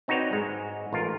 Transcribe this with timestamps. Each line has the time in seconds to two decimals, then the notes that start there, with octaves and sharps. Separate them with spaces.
0.08 C4 D#4 F#4 B4 C#5 D5
0.33 G#2 G#3
0.93 A1 F4 A#4